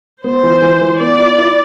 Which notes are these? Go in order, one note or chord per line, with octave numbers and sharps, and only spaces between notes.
B3 C5
E3
E3
E3
B3 D5
E4
E4